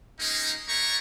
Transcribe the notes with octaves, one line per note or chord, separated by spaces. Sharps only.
G#3 A#3 C#4 D#4
A3 D4 C#5 A#5 C#6